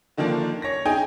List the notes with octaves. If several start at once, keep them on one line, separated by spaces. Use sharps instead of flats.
D3 D#3 F3 A#3 D4
C#5 A#6
D#4 G#4 D#5 G5 G#5